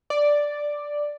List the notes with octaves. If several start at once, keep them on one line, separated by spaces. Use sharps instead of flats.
D5